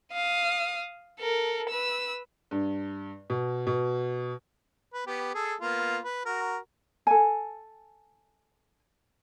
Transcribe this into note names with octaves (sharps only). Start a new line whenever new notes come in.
F5 D#6
A4 A#4
B4 E6
G2
B2
B2
B4
B3 G4
G#4 A4
A#3 B3 F4
B4
F#4 A#4
A4 G#5